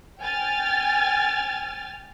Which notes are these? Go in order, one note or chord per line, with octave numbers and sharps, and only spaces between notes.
G5 G#5 F6 A6